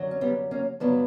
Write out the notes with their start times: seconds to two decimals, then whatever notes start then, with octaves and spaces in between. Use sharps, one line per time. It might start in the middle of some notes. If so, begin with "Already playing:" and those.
Already playing: F#2 D3 F#3
0.11 C#4
0.21 G3 B3
0.51 A#3 C#4
0.80 G2 D3 F#3 B3 D4